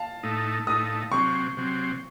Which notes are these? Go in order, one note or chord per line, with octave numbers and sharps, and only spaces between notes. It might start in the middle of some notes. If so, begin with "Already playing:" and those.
Already playing: F5 A5
A2 A3 D#4
A2 A3 D#4 D#6
C3 F#3 C4 C#6
C3 F#3 C4